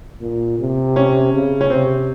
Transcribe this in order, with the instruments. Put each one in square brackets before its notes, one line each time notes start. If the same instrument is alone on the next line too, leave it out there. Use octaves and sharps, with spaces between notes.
[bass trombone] A#2
C3
[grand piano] C#4
[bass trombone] C#3
[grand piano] C#4
[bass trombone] C3 [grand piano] C4